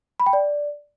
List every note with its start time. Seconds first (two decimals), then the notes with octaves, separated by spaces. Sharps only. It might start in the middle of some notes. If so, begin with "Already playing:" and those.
0.20 B5
0.26 G5
0.33 D5